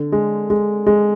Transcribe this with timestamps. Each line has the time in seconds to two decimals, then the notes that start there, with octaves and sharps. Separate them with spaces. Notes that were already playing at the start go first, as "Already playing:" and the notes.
Already playing: D3
0.12 G#3
0.50 G#3
0.87 G#3